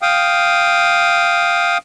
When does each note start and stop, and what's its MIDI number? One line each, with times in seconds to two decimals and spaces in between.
0.02 1.78 77
0.02 1.78 79
0.02 1.78 87